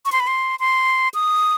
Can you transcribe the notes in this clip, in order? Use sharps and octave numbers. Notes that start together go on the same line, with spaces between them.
C#6
C6
B5
C6
C6
D#6